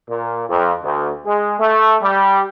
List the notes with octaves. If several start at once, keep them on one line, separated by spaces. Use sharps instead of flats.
A#2
F2
D2
G#3
A3
G3